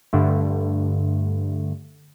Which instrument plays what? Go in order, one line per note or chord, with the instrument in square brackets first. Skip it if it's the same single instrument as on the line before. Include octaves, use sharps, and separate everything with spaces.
[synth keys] G2 D3 A3